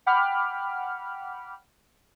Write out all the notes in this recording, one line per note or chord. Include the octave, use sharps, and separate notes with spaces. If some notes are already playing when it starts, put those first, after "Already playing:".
F#5 G5 B5 D6 F6